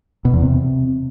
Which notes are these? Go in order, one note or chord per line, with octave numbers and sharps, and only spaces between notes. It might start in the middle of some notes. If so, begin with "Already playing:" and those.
B2
E2
C3